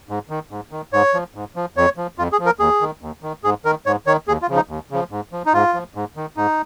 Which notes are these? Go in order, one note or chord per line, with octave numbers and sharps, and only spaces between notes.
G#2
D#3
G#2
D#3
G#2 C#5
F3
G#2
F3
F2 C#5
F3
F2 F4
G#4
F3
A#4
D#2 G#4
D#3
D#2
D#3
G#2 G#4
D#3 A#4
G#2 C#5
D#3 C#5
D#2 G#4
F4
C#3 F3
D#4
D#2
C#3 F3
G#2
F3
D#4
G#2 F4
F3
G#2
D#3
G#2 D#4